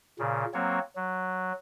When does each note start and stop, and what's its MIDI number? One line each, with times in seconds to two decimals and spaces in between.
0.19 0.45 46
0.19 0.45 49
0.54 0.79 54
0.54 0.79 58
0.54 0.79 60
0.54 0.79 73
0.96 1.52 54